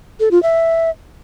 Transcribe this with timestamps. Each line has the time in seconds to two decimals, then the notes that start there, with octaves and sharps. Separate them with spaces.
0.20 A4
0.31 F4
0.43 E5